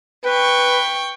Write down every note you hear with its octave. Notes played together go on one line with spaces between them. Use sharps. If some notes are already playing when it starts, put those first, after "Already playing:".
B4 G5 C#6